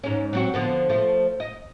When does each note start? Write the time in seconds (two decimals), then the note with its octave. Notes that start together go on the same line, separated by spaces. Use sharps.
0.04 G#2 C#4
0.33 F#3 C4 F#4
0.54 D3 F3 B3
0.89 F3 A3
1.40 D#5